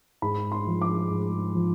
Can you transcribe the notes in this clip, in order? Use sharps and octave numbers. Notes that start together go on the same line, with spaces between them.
G#2 B5
C6
F3
D6
G#2
F3